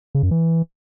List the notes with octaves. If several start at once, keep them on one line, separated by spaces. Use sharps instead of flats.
C#3
F#2
E3